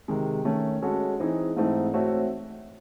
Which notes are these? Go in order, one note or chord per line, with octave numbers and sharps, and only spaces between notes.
C3 D#3 G#3
D#3 A3 C#4
G#3 C#4 F#4 A4
E3 C4 D#4 G#4
G#2 E3 A3 C4 D#4
A3 C4 F#4 C#5 E5